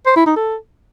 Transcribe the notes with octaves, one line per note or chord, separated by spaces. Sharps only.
C5
E4
D#4
A4